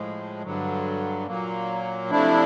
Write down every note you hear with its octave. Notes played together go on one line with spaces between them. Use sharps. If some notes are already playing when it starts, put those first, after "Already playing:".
Already playing: A2 F3 G#3
G2 D3 F#3
A#2 F#3 A#3
C3 F3 A3 D4 E4